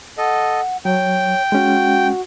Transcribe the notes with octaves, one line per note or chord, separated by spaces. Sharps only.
A4 D#5 F#5
F#3 C#5 G5
G#3 C#4 F#4